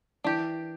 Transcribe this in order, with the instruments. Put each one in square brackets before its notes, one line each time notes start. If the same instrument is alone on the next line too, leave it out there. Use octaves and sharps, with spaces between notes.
[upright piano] E3 [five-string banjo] D4 G4